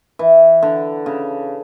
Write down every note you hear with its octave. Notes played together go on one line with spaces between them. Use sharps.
E3
D3
C#3